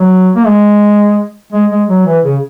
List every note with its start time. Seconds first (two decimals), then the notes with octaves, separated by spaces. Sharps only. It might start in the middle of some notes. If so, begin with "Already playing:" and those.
Already playing: F#3
0.35 A#3
0.46 G#3
1.53 G#3
1.71 G#3
1.89 F#3
2.06 E3
2.24 C#3